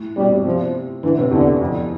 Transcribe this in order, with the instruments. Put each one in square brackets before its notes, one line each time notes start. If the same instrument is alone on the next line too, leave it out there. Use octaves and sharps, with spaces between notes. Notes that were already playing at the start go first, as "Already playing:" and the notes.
Already playing: [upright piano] A2
[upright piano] B2 [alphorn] G3
[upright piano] C3
[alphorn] F3
[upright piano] D3 [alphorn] E3
[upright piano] C3
[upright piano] E2 [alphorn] D3
[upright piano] F2